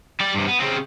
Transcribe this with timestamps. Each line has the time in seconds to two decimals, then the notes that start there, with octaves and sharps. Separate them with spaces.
0.20 G3 D5
0.35 G2 C3
0.47 B3
0.60 C#3 C4